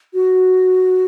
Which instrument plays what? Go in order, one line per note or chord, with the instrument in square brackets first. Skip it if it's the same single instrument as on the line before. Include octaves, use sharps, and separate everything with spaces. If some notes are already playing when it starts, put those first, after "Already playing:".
[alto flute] F#4